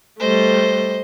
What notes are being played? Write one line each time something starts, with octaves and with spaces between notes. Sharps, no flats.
G3 A3 C5 D#5